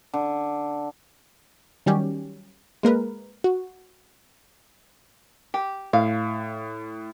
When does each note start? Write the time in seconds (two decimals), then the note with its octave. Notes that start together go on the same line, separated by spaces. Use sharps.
0.14 D3
1.86 D#3 F#3 G3 C#4 G4
2.83 G#3 A#3 A#4 B4
3.44 F#4
5.54 G4
5.93 A2 F5